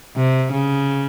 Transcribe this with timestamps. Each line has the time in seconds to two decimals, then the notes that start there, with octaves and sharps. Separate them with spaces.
0.16 C3
0.52 C#3